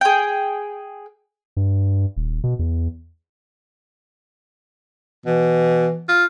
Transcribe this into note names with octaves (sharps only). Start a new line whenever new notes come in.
G#4 G5
G2
D#1
B2
E2
B2 E3
F4